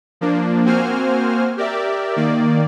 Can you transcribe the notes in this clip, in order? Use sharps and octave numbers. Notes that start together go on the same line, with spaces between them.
F3 A#3 D4
A#3 C4 F#4 C5 G#5 F6
G4 A#4 D5 E5
D#3 A#3 D5